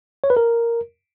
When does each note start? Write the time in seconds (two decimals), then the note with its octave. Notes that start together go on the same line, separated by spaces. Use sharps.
0.24 C#5
0.30 B4
0.37 A#4